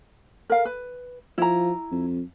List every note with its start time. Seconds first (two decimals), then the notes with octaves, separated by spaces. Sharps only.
0.50 A#4 F5
0.65 B4
1.38 F3 E4 A#5
1.91 F2